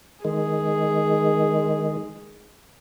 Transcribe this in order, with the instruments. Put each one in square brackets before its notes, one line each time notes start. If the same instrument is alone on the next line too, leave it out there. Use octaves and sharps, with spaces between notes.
[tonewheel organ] D#3 G#3 [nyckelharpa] G#4